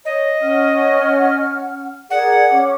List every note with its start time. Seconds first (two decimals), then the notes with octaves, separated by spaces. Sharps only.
0.05 C#5 D#5
0.41 C#4 F#5 F6
2.10 G#4 A#4 D5 F#5
2.52 C#4 D6